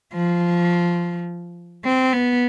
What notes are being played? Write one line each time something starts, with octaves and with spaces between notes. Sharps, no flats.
F3
C4
B3